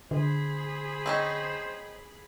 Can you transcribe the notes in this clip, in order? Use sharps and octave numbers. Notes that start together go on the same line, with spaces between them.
D3 G#4 C5 B5
C4 C#4 D#4